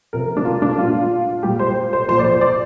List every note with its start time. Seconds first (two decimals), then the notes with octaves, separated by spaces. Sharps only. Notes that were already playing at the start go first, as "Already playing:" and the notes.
0.13 C3 F3 A#4
0.37 D4
0.45 F4
0.62 D4
0.78 A#2 G3 F4
1.43 A#2 G3 G4
1.59 C5
1.93 C5
2.08 A#2 F3 C5
2.19 D5
2.25 C5
2.41 D5